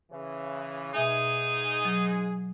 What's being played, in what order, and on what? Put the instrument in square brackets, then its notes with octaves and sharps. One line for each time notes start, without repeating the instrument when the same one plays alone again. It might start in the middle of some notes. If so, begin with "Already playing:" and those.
[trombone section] C#3 E3
[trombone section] G#2 G#3 G#4 [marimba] B2 E5 G#5 [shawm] D#4
[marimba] F#3